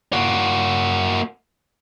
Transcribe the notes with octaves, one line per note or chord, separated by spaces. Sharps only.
A#3 F#4